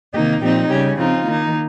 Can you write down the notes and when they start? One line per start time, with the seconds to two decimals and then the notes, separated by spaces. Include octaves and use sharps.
0.13 C3 D#3 A#3 D#4 G4
0.41 A#2 F3 C4 D#4 G4
0.70 C#3 G3 C#4 G4
0.98 F3 C4 D#4 F4
1.26 D#3 A#3 D#4